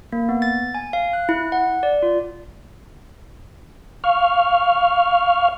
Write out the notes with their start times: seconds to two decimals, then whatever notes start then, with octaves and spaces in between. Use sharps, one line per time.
0.13 A#3
0.29 B3
0.42 A6
0.75 G#5
0.93 F5
1.13 F#6
1.29 E4
1.52 F#5
1.83 D5
2.02 F4
4.04 F5 C#6 F6